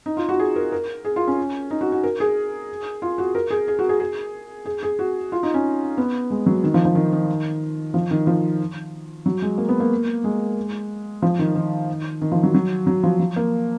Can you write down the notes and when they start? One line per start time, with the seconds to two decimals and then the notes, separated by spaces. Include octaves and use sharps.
0.06 D#4
0.17 F4
0.29 F#4
0.39 G#4
0.56 A#4
0.72 A#4
1.05 G#4
1.16 F4
1.27 C#4
1.71 D#4
1.81 F#4
1.92 F#4
2.04 A#4
2.20 G#4
3.02 F4
3.18 F#4
3.35 A#4
3.50 G#4
3.68 G#4
3.79 F#4
3.89 G#4
4.00 G#4
4.66 G#4
4.83 G#4
4.99 F#4
5.32 F4
5.43 D#4
5.54 C#4
5.98 B3
6.30 G#3
6.46 F#3
6.63 D#3
6.74 F3
6.85 F3
6.95 D#3
7.13 D#3
7.94 F3
8.11 D#3
8.27 F3
9.26 F#3
9.42 G#3
9.58 A#3
9.69 B3
9.80 A#3
10.24 G#3
11.22 F3
11.39 D#3
11.55 D#3
12.21 D#3
12.32 F3
12.43 F#3
12.54 F#3
12.87 F#3
13.03 F3
13.20 F3
13.36 A#3